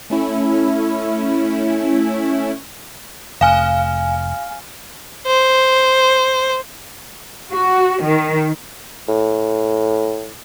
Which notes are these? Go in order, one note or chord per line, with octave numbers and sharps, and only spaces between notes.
A3 C#4 E4
F1 F5 G#5 F6
C5
F#4
D#3
A2